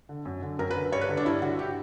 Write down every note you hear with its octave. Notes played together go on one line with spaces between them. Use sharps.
D3
F#2
D3
F#2 A#4
B4
D3
G2 C#5
B4
D3
D4
G2 E4
D3 F#4
G4